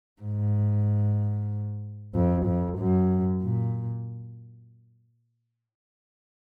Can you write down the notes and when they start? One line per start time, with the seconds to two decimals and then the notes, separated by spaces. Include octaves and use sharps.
0.22 G#2
2.15 F2
2.46 F2
2.78 F#2
3.42 A#2